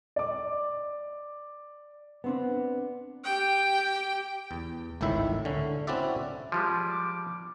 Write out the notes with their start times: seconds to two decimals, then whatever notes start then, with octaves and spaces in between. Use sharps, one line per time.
0.16 D5 D6
2.24 B3 C4 D4
3.24 G4 G5
4.51 E2
5.01 G#1 C#2 A2 D#3 E4 E5
5.45 D3 C#4
5.87 C4 C#4 E4 F#4 D5 E5
6.52 F3 G3 G#3 D6